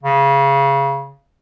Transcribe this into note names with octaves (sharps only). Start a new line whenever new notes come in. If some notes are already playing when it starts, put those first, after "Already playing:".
C#3